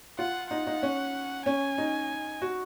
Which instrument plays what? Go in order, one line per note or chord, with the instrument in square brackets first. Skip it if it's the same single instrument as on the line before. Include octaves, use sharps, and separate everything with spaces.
[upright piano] F4 [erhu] F#5
[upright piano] D#4 [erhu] F#5
[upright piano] D#4
C#4
[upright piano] C#4 [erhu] G#5
[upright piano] D#4
F#4